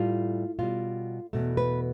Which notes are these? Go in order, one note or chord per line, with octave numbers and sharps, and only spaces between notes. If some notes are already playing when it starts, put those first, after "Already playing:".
Already playing: A2 G3 F4
B2 G3 F4
E2 B2 A3
B4